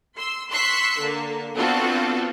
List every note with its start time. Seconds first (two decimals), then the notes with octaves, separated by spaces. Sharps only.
0.17 C6 E6
0.50 C6 C#6 E6 F#6 B6 C7
1.01 D3 A#3
1.56 B3 C4 D4 F4 F#4 A4